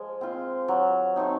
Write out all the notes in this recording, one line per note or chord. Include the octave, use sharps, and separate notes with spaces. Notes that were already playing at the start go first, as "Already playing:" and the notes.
Already playing: F3 G#3
C4 F4
F#3
A3 C4 D#4